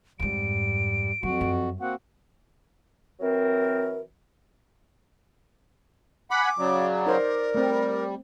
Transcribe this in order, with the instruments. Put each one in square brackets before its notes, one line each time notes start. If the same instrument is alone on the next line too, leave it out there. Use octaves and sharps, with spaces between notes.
[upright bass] F2 G#2 [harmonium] G3 [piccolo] D7
[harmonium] F2 F#4 [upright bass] F#3
[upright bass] F#2
[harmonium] A#3 C4 F#4 [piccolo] F#5
[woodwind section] E3 F#3 C4 A#4
[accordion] F#5 B5 [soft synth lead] G#5 [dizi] D6
[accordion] C#3 F#3 [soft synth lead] D5
[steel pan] D#4 C5 [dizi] A#4
[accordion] G3 [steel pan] A3 C4